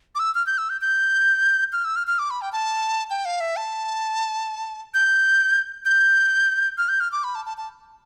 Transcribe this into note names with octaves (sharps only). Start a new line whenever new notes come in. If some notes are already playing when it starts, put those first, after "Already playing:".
D6
E6
F6
G6
E6
G6
G6
F6
E6
F6
F6
D6
B5
G5
A5
G5
F5
E5
A5
G6
G6
F6
G6
F6
D6
B5
A5
A5
A5